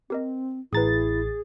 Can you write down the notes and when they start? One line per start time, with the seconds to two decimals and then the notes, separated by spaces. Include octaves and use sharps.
0.10 C4 G4 A#4 D#5
0.73 A1 E4 G#4 B4 A#5 D#6 A6